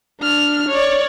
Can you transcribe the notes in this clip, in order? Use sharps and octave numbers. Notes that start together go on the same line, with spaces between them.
D4 F6
C#5 D5